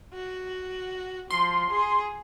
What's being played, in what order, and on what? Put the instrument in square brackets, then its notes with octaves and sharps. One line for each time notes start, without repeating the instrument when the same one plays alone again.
[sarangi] F#4
[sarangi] F3 [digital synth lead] C6
[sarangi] G#4